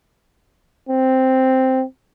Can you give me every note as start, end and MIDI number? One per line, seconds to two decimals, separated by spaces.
0.89 1.84 60